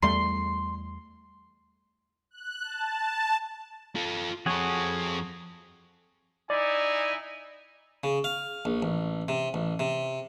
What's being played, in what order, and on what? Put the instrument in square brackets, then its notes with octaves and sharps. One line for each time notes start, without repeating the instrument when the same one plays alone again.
[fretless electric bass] E2 G3 A3 [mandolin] C6
[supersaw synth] F#6
A5
[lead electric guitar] F4 A4
[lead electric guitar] F2 A4 [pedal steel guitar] F#4 G#4 C#5
[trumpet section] D#4 E4 G#5 [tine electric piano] D5
[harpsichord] C#3
F5
A#1
A1
C3
A1
C3